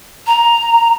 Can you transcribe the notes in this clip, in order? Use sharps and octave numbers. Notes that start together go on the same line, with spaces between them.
A#5